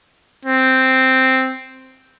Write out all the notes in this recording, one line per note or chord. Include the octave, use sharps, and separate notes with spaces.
C4